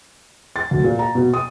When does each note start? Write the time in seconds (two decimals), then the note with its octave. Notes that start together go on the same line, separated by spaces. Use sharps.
0.56 A6
0.71 D2
0.84 A#2
0.99 A#5
1.15 B2
1.34 D#6